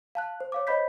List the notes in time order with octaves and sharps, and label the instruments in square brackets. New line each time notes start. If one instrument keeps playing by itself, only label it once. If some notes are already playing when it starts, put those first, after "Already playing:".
[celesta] F5 A5 F#6
C5
C#5 F5 D6
C5 C#5 D#5 B5 G6 B6